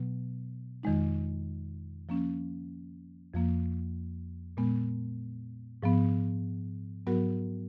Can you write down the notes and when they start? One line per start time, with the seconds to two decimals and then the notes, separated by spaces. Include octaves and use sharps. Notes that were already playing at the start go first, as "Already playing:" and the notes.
Already playing: B2 F#3 B3
0.83 F2 D#3 G#3 D#4
2.09 F3 A#3 C#4
3.34 F2 F3 A#3
4.57 A#2 G#3 B3
5.83 G#2 F3 B3
7.07 G#2 F#3 B3 F#4 A#4